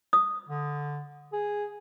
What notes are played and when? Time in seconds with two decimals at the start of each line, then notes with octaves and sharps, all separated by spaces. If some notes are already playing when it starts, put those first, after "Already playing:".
0.13 D#6
0.49 D3
1.32 G#4